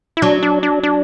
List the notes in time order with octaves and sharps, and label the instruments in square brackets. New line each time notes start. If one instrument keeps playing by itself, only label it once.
[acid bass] E4
[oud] F#3 [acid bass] D4
[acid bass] D4
D4
D4